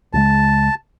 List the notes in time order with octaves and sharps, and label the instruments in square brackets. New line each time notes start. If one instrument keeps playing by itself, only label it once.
[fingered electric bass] C#2 C#3 G#3 [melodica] A5